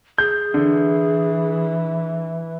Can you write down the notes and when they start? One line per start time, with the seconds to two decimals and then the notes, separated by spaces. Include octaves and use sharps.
0.18 G#4 G6
0.54 D3 E3